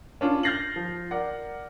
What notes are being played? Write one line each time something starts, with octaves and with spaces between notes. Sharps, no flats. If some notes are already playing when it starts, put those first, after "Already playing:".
C#4 D4 F4
F6 G6 A6 A#6 C7 F#7
F3
A#4 D5 F#5